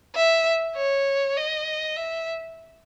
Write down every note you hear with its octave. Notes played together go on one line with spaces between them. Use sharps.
E5
C#5
D#5
E5